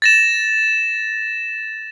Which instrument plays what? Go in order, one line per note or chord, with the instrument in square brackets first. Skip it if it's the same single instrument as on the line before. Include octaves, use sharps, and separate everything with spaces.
[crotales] A6 A#6 E7